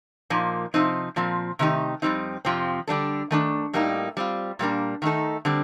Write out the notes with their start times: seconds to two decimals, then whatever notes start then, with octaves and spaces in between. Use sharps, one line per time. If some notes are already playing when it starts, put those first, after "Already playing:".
0.30 A#2 F3 A#3 D#4
0.74 C3 F3 C4 D#4
1.16 A#2 F3 C4
1.59 C3 D#3 A3 D#4 G4
2.02 F2 C3 G3 C4 D#4
2.45 F2 C3 F3 C4
2.87 D3 G3 D4 A4
3.31 D#3 A3 D4
3.73 A2 G3 A#3 D#4
4.17 G3 C4 F4
4.59 A#2 G3 A#3 D4
5.02 D#3 A3 D#4 A4
5.45 D3 G3 C4